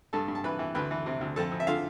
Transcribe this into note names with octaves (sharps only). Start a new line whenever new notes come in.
G2 A4 A5
G2
A5
E3 B4 B5
E3
D2 B4 B5
E3
C3
D2
F2 A4 A5
F2
E5
D3 F4 F5